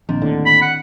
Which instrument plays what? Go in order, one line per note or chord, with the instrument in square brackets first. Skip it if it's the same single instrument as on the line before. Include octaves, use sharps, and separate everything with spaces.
[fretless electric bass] A#1 [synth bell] D#3 C4 D4
[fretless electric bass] D#2 A2 D3
[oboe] B5
F#5